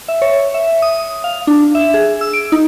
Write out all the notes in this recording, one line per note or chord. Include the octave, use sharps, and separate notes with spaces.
E5
C#5
E5
D#6
F5
D4
E5
G#4
E6
D7
D#4